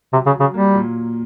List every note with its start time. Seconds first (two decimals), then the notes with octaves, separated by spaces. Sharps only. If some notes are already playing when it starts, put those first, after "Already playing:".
0.13 C3 F#3
0.26 C#3
0.34 F#3
0.40 C#3
0.54 G3 A#3
0.75 A#2